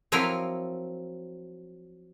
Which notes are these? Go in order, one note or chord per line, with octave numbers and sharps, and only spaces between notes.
F3 F#3 C4 E4 A#4 F5